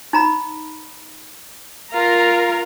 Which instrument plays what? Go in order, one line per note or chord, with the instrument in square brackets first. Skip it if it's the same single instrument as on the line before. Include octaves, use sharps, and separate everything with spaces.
[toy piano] D#4 A#5 B5
[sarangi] F4 [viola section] A#4 A#5